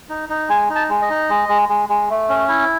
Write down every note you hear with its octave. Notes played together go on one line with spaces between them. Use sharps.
D#4
D#4
G#3 G#5
D#4
A5
G#3
D#5
D#4
G#3
G#3
G#3
G#3
A3
C#4
E4